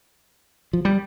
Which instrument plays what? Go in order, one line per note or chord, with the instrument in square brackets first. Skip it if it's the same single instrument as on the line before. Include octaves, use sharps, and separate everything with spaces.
[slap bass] F3
G3